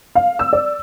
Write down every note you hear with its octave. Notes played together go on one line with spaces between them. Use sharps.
F5
E6
D5